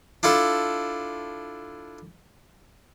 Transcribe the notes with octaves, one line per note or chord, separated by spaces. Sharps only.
D4 E4 F4 A4